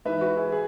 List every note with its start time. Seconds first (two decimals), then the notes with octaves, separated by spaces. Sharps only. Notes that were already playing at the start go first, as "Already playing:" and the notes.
0.05 G#2 E3 B4 E5
0.21 F#4 B4
0.37 E4 G#4
0.52 G#4